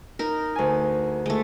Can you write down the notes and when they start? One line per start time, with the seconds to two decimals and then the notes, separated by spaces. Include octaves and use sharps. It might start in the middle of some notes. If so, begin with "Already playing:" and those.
0.19 D#4 A#4
0.56 D2 G#5
1.26 G#3 A3